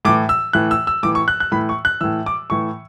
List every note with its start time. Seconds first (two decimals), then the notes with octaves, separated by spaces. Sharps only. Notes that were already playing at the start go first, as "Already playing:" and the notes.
0.05 A2 E3 D6
0.29 E6
0.53 A2 E3 F#6
0.71 E6
0.87 E6
1.03 A2 E3 D6
1.15 C#6
1.28 F#6
1.40 F#6
1.52 A2 E3 B5
1.69 C#6
1.85 F#6
2.01 A2 E3 E6
2.26 D6
2.50 A2 E3 C#6